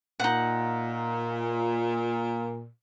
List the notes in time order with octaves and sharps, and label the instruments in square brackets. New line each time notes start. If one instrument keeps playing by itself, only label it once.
[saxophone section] A#2 [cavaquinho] D#4 F#5